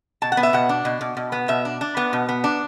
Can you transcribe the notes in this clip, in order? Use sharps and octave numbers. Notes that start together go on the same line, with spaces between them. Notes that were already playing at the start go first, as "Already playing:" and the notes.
B2 A5
F#5
B3
E5
B2 F#5
D4
B2
B2
B2
B3
B2 E5
D4
D4
B3
B2
B3
D4